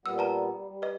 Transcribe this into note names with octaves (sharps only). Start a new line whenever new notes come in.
A#2 G3 B3 E6
B4 A5 A#5
G3
G3
B4 D#5